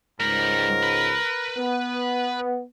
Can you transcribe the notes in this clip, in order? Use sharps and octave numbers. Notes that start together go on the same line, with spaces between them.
C#2 G#2 G3 A#4 B5
B4
B3